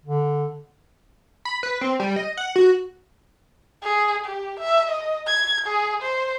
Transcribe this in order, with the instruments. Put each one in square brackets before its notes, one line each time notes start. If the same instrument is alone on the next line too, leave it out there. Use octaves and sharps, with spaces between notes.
[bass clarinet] D3
[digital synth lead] B5
B4
C4
G3
D#5
F#5
F#4
[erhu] G#4
G4
E5
D#5
G#6
G#4
C5